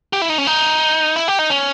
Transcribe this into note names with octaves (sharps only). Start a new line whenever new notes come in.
G4
E4
D#4
C#4
D#4
E4
G4
D#4
C#4